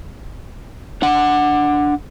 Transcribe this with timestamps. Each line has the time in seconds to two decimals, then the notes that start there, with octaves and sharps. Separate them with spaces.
1.02 D4 F#5